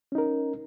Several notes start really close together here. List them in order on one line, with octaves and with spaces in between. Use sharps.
C#4 D#4 A#4